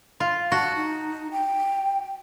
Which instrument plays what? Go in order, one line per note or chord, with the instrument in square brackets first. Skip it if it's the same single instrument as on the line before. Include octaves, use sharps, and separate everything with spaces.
[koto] F4
[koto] F#4 [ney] A5
[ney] D#4
G5